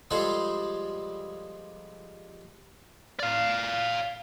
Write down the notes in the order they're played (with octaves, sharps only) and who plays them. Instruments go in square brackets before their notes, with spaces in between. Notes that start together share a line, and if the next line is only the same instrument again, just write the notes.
[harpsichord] F3 G3 G#3 G#4 A4 C5
[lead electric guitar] D5 F5